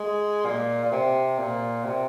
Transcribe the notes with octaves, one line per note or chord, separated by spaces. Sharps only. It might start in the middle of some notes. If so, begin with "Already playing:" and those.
Already playing: G#3
A#2
A#2
C3
A#2
C3